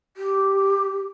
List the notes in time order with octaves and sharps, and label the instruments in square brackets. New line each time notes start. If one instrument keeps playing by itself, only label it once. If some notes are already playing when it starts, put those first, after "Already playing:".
[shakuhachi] G4